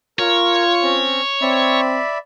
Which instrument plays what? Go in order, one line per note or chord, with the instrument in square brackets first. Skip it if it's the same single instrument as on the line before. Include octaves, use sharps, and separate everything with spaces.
[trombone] F4 [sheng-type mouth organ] A#4 [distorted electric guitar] C#5
[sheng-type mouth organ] C4 C#4
[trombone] C4 [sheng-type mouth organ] D5 E5 B5